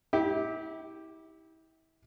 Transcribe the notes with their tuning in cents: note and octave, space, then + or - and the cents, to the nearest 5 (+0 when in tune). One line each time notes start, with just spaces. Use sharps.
E4 -35 G4 +0